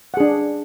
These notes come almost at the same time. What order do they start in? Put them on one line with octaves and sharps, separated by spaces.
F#5 G#4 D4